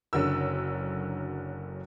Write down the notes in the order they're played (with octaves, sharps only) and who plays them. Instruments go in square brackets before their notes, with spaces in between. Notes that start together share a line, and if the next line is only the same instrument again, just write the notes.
[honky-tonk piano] F#1 D3 F#3 F#4 A#4 E6